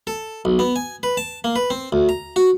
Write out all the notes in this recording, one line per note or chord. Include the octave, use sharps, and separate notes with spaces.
A4
B1
B3
G#5
B4
A5
A#3
B4
C4
D2
A#5
F#4